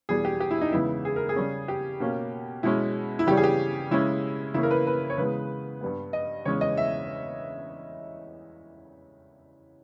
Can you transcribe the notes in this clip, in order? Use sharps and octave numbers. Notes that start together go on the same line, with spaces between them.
E2 B2 G3 G#4
G4
G4
E4
D#4
E2 C#3 G#3 B3 E4
G#4
A#4
G#4
C#3 G3 C#4
G4
B2 A#3 C#4
B2 G#3 C#4 E4
E4
C#3 E3 G3 C#4 G4
G#4
G4
C#3 G#3 C#4 E4
C#3 E3 A#3 C#4 E4
A#4
B4
B4
C#5
C#3 E3 G#3 B3 B4
G2 G3 B3
D#5
E2 C#3 E3 G#3 C#4 C#5
D#5
E5